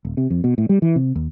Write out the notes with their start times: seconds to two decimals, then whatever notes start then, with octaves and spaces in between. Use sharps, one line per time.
0.05 D#1
0.17 C3
0.30 F2
0.44 B2
0.58 A2
0.69 G3
0.82 E3
0.96 C3
1.15 D#2